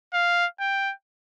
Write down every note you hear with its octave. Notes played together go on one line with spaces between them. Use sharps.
F5
G5